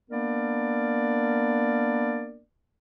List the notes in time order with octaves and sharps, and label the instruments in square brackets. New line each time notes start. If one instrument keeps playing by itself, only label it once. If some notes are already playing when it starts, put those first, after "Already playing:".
[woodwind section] A#3 B3 D4 A#4 D5